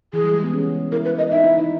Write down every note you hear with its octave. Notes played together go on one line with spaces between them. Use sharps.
E3 G#4
G3
G#3
B3
C#4
E4 A#4
B4
D#5
D#4 E5
E4
D#4